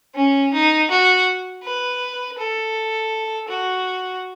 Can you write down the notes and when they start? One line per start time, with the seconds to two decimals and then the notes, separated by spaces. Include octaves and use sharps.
0.15 C#4
0.53 D#4
0.90 F#4
1.64 B4
2.39 A4
3.49 F#4